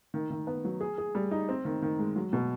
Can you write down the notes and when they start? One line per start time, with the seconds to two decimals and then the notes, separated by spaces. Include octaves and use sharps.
0.14 D#3
0.30 D#3
0.47 B3
0.65 F#3
0.81 G#4
0.98 G#4
1.15 G3
1.31 D#4
1.49 C4
1.65 D#3
1.82 D#3
1.99 G#3
2.16 F#3
2.33 B2